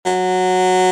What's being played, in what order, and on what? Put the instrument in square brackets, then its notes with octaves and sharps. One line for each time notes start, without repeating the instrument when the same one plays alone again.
[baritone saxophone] F#3